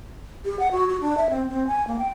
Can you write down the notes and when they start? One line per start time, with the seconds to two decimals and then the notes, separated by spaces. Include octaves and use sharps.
0.45 G4
0.59 F#5
0.71 F#4
0.89 F#4
1.01 D4
1.17 E5
1.30 C4
1.49 C4
1.67 G#5
1.87 A#3
1.99 G5